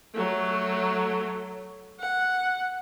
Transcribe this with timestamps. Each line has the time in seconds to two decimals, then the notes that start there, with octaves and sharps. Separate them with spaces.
0.14 F#3 A3
2.00 F#5